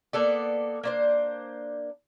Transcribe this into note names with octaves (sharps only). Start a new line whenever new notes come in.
A#3 B3 A4 D5
A#3 D4 C5